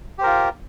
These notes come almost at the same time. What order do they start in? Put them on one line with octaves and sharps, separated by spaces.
G4 C5 A#4 F4